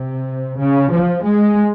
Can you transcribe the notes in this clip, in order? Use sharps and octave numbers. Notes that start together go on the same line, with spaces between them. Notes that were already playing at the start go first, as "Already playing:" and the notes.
Already playing: C3
C#3
F3
G#3